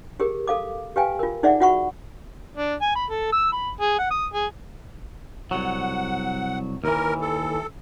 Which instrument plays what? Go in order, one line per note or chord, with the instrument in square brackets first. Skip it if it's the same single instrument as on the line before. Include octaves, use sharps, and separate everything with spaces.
[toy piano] G4 G#4 A#4
A4 F5 D6
G4 B4 F5 G5 G#5
F4 A#4
D#4 G#4 D5 E5 F#5
F4 F#4 F#5 B5 C#6
[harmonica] D4
G#5
B5
A4
E6
B5
G#4
F#5
D#6
G#4
[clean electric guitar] C2 F#3 [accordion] F#5
[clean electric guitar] D#2 E3 [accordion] A#4
[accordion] A4